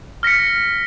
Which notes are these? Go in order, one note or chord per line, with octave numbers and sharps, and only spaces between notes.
F6 A#6 B6 C#7